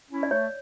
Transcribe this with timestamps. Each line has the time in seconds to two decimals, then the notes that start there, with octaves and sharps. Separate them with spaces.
0.10 C#4 E4
0.23 D5
0.31 A3 C#5